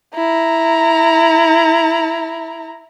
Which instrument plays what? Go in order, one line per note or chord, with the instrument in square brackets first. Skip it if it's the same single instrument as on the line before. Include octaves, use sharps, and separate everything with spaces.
[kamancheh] E4 A#5